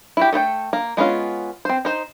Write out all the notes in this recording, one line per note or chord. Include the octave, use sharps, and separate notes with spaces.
E4 F#4 G4
A3 A4 C5 G5
A#3
G#3 B3 C#4 F4
C4 C5
D#4 C5